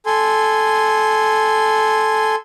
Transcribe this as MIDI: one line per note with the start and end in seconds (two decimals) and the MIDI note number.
0.06 2.35 69
0.06 2.35 80
0.06 2.35 84